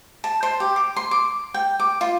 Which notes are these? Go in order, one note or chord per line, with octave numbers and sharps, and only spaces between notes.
A5
C5
G4
D6
C6
D6
G5
D6
F4